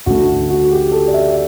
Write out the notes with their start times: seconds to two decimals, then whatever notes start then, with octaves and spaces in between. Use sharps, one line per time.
0.06 D2 D3 A3 F#4
0.50 F#4
0.71 G4
0.92 A4
1.08 D5
1.14 E5